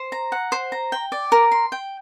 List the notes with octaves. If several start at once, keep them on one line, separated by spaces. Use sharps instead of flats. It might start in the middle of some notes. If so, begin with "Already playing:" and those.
Already playing: C5
A#5
F#5
C5
A#5
G5
D5
A#4
C6
G5